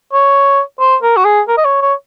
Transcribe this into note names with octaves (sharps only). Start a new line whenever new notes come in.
C#5
C5
A#4
F#4
G#4
A#4
D#5
C#5
C#5